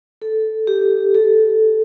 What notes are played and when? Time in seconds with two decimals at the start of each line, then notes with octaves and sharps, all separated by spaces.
0.22 A4
0.67 G4
1.14 A4